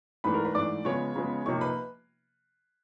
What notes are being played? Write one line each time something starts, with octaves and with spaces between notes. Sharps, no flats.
G#2 E3 A3 D4 B4 B5
A#4 A#5
B4 B5
G#2 E3 A3 D4 D5 D6
C#3 F3 G#3 B3 C#5 C#6
C#3 F3 G#3 B3
C3 F3 A#3 D#4 C#5 C#6
B4 B5